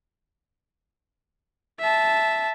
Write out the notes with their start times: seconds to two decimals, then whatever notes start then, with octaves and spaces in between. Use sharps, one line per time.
1.80 E5 A5